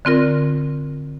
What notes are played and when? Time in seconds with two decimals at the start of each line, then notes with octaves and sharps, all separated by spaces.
0.05 D3 C4 F4 A#4